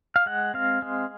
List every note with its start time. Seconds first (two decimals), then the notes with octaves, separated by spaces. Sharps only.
0.16 F5
0.26 G#3 F#5
0.54 C4 F5
0.82 G#3